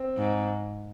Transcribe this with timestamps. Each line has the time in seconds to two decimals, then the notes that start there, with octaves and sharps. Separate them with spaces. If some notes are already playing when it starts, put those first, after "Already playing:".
Already playing: C4
0.17 G#2